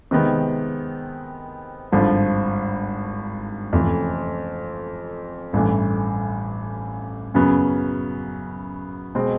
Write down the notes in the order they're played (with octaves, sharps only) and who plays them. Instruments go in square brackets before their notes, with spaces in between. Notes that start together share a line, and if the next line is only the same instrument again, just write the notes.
[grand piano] C3 D#3 G#3 B3
G#1 G2 D3 F3
F2 C3 E3 A3 C#4
A1 G2 E3 A3
F#2 C#3 F#3 B3
B2 G#3 C4